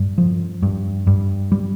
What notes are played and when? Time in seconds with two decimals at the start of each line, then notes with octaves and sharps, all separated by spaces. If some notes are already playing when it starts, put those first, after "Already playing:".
Already playing: G2
0.18 F3
0.63 G2
1.07 G2
1.52 G3